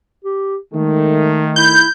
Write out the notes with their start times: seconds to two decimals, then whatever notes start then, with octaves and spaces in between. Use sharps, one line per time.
0.24 G4
0.73 D#3 G#3 A3
1.56 E4 G6